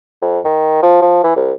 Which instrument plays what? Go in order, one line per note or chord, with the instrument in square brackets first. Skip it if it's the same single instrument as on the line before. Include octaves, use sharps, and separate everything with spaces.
[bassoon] F2
D#3
F3
F3
E3
C2